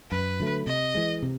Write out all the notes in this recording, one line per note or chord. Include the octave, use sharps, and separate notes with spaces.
F#2 B4
D3 F#3 A3
C3 D#5
E3 G#3
C3